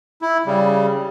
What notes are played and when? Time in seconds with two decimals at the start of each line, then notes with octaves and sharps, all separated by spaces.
0.22 E4
0.46 C#3 G3